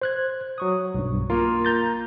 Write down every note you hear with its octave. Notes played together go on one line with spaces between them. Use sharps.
C5 F#6 G#6
F#3 C#6 D#6
B1 G2
A#3 F4 A#4
A#5 G6 A6